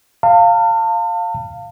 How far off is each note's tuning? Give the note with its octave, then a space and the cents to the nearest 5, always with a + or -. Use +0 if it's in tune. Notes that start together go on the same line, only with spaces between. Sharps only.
F5 +0 A5 +40